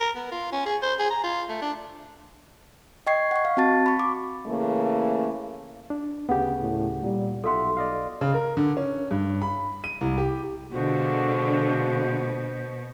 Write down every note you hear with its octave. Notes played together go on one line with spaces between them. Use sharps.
A#4
B3
F4
C#4
G#4
C5
G#4
A#5
F4
A3
D4
D#5 G5 C#6 G#6 C7
F#5 C#6
F5
C4 F#4 A5 A6
B5 C#6
D6
C#3 E3 A3 A#3
D4
D2 C#3 B3 G4 F#5
A2
A#2 G3
B1 F4 A4 E5 F#5 C6
D5 D#5 F5
C#3
A#4
D3
C#4
G2
B5
D#7
C2
G4
B2 D3 G#3 F4 F#4 C5